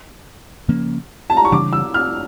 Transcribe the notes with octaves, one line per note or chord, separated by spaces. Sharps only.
C#3 F3 A#3 C#4
A5
A#5
C#6
C#3 E3 G3 D4 D6
E6
F6